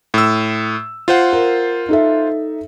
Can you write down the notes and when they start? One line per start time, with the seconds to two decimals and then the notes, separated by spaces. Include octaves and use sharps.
0.14 A2 E6
1.08 F4 C5 F#5
1.33 A#4
1.89 D#4 A4 E5